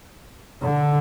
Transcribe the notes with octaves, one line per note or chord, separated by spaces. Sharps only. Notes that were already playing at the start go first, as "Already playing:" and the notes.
D3